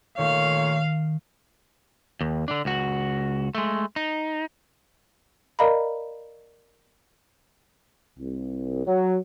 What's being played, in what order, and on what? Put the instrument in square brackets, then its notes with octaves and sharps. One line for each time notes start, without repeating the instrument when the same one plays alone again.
[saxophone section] A#2 A3 C#5 [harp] D#3 [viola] F5
[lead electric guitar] D#2
D3 D4
C#2 F#4
G#3 A3
D#4
[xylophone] A#4 D5 D#5 F5 A#5 B5
[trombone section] C2
F#3